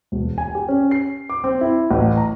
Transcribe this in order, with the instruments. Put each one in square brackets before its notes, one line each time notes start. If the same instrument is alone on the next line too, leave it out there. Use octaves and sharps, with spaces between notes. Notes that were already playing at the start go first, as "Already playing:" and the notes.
[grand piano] E1
G#5
G4
C#4
C7
D6
C4
E4
A1
A#5